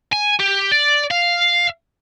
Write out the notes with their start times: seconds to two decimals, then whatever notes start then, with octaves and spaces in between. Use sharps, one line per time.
0.12 G#5
0.39 G4
0.72 D5
1.11 F5